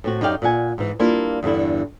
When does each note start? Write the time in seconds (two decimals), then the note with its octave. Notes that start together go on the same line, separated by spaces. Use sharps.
0.04 A2 C4 F#4
0.21 F#2 D#4 G4 D5 F5 G5
0.42 A#2 D5 F#5 G#5
0.78 G#2 E3
0.99 G3 A#3 D4 E4 F4
1.43 E2 G2 D3 E4